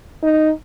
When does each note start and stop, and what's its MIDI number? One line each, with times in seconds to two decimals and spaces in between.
0.23 0.51 63